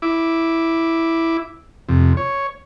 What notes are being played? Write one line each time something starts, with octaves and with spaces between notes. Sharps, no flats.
E4 D6
F2 C3
C#5